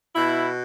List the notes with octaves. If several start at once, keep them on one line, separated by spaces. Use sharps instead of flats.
B2 E4